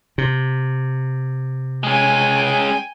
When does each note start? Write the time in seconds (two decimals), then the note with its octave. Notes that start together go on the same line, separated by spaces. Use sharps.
0.18 C3
1.84 G#3 C#4 G5 G#5